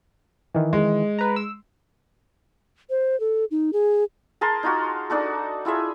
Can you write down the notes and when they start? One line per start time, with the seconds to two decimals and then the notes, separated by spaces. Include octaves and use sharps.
0.54 D#3 E3
0.73 G#3
1.18 B4 A#5
1.36 E6
2.90 C5
3.20 A4
3.51 D#4
3.73 G#4
4.41 G#4 A#4 A5 C6
4.63 D#4 F4 F#4
5.10 D4 D#4 F#4 A4
5.65 E4 F4 G#4 E5